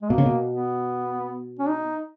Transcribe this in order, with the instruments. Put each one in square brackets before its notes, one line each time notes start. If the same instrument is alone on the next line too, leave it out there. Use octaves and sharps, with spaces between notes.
[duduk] G#3
[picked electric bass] B2 [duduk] A#3
[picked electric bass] C#3
B2
[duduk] B3
C#4
D#4